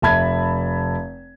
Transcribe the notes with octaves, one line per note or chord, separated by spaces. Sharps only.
F1 E5 A5 B5 G#6